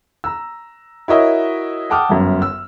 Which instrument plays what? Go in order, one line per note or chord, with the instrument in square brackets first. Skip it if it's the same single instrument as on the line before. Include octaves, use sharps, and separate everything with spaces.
[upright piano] A#5 E6
E4 F#4 A#4 C#5 D#5 E5
F#5 G5 A5 D6 D#6 F6
G1 F#2
E6